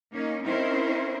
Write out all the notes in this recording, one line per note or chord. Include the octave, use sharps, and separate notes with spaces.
A#3 C#4 D#4
C4 C#4 D#4 E4 A#4 C5